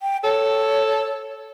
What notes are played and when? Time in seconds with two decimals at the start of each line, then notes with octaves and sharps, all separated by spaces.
0.01 G5
0.24 A4 C#5